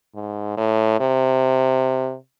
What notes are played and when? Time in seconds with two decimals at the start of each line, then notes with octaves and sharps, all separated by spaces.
0.15 G#2
0.57 A2
1.00 C3